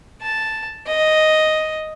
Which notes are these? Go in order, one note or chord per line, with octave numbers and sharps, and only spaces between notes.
A5
D#5